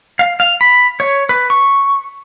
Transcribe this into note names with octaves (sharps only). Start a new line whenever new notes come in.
F5
F5
B5
C#5
B4
C#6